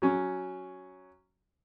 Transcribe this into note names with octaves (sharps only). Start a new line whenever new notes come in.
F#3 C#4